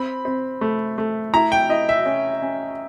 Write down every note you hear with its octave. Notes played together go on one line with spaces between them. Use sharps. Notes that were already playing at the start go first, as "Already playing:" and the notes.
Already playing: C4 B5
C4
A3
A3
E4 A#5
G5
E4 D#5
E5
C#4
C#4